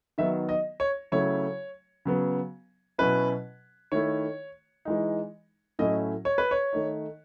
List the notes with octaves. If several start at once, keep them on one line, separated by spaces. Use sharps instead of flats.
D#3 F#3 B3 D#4 E5
D#5
C#5
C#3 F#3 A3 E4 C#5
C#3 F#3 B3
B2 F#3 C#4 E4 B4
D#3 A3 E4 C#5
E3 G#3 D#4
A2 F#3 A3 C#4 E4 D#5
C#5
B4
C#5
D#3 A3 D#4